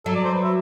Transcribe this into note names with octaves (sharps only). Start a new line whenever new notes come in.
F#3 A4
D5
C5
B4
E5